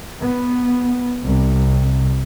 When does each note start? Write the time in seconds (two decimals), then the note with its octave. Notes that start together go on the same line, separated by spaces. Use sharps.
0.20 B3
1.21 C2